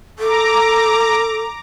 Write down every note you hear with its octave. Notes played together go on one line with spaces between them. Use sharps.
A4 A#5 D6